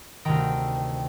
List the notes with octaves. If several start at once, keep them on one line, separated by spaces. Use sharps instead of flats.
D2 C3 D#3 G5 A#5